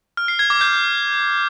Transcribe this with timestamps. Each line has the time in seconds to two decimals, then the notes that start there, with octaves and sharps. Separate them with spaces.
0.17 F6
0.28 C7
0.39 G#6
0.50 D6
0.61 G6